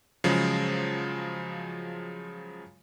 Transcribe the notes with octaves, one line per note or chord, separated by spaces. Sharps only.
C#3 F3 F#3 G#3